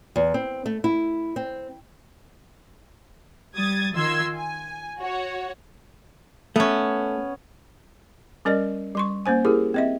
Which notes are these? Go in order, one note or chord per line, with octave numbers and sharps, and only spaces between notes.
E2
C4
A3
E4
C4
G3 D#6 G#6 A6
D#3 F4 C6 E6 G#6
G#5
F#4 C#5
A3 B3 C#4
G3 C#4 A#4 D5 D#5
G3 C6 C#6
A#3 C#4 C5 G#5
E4 G4 G#4 A#4
C4 D#5 E5